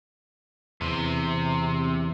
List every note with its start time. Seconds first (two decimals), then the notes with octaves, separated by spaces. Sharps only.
0.81 E2 C3